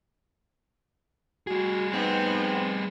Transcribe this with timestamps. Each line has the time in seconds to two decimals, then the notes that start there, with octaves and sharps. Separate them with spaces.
1.47 G3 F#4 G#4
1.93 B3 C4 D#4